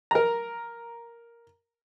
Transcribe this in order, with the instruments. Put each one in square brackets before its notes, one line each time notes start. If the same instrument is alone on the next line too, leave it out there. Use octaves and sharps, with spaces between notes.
[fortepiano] A#4 A#5